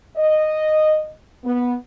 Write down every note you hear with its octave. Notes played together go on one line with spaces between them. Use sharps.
D#5
B3